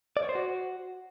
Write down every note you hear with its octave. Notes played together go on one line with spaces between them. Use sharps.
D5
C#5
C5
F#4